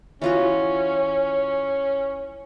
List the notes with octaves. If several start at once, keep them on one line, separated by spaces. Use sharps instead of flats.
E3 C#4 F4 F#4